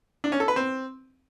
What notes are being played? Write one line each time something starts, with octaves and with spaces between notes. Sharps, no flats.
D4
C#4
A4
B4
C4